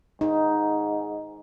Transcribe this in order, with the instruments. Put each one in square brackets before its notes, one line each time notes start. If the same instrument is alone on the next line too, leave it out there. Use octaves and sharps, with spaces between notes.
[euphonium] G#2 [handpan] D#4